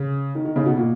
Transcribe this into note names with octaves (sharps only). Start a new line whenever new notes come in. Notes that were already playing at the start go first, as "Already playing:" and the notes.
Already playing: C#3
D#3
D#3
C#3
B2
A#2